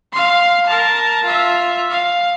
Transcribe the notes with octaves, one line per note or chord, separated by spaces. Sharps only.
F5 C6
A#4 A5
F4 E5
F5